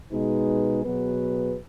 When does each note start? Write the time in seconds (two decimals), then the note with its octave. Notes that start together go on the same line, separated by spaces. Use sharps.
0.12 B2 G#3 D#4 G#4 B4
0.84 B2 F#3 B3 G#4 B4